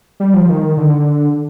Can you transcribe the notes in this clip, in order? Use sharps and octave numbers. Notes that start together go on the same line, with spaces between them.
G3
F3
D#3
D3